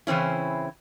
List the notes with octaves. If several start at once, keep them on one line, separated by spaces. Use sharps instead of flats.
C#3 E3 C4 C#4 E4